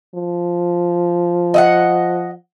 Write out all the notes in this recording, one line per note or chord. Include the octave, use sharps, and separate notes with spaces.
F3
D#5 E5 F#5